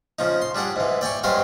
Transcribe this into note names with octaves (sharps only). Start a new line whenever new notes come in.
C#3 F3 D#4
C6
G3 D4 G#4 F#5
G#2 E3
D5 G5 G#5 C#6
G2 F#3 G#3 C4 G4 F5